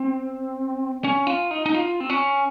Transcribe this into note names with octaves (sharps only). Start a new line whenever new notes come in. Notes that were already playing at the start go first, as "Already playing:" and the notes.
Already playing: C4
C#4
F4
D#4
D#4
F4
C4
C#4